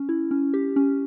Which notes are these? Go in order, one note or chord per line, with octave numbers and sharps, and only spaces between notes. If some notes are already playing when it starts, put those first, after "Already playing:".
Already playing: C#4
E4
C#4
G4
C#4